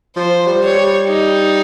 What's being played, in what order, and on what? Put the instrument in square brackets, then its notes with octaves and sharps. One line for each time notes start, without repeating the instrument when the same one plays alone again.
[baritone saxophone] F3 [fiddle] C5
[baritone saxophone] G3
[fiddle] C#5
[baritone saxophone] G3
[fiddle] D#4